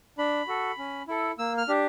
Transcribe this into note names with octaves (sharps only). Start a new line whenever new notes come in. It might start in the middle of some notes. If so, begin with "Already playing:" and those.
D4 B5
F#4 A4
C#4
E4 A4
A#3 E6
F6
D4 G4